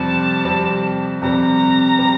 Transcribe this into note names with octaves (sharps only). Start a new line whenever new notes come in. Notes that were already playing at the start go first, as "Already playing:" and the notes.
Already playing: F2 C3 G3 C4 A5
F2 C3 G3 C4
F2 C3 G3 C4 A#5
C3 G3 C4